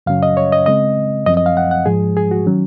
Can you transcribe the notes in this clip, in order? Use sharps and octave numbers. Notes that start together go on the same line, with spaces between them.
F#2 C#3 F#3 C#4 F5
D#5
C#5
D#5
C#3 G#3 C4 D#5
F#2 F3 C4 D#5
D#5
F5
F#5
F#5
G#2 F3 G#3 G#4
G#4
F#4
D#3 F#3 C#4